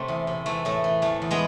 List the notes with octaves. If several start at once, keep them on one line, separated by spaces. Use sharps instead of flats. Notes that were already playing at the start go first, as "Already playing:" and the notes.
Already playing: C3 A3 C4
E2
C3
E3 A3
A2 A3
E3
E2 A3
E2
G#3 B3